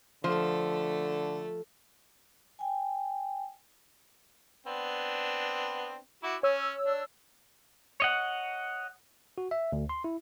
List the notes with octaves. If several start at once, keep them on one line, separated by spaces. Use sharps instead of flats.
D3 F3 A3 A4 C5
G5 G#5
B3 C4 D4
E4 F#4 D6
C#4 C#5 G#5 E6
D4
C#5 D#5 F#5
F#4
E5
D2
C6
E4